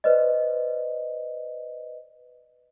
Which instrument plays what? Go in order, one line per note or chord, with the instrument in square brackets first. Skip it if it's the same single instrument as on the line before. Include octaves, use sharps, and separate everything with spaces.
[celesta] B4 C5 D5 D#5